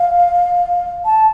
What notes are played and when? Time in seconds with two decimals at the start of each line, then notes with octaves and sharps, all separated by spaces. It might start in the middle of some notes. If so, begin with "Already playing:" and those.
Already playing: F5
1.06 A5